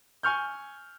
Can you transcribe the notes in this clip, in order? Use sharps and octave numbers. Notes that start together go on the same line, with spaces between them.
G#5 C#6 F6 G6